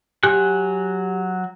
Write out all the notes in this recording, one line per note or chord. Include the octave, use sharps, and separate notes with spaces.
F#3 G4 G#5 F#6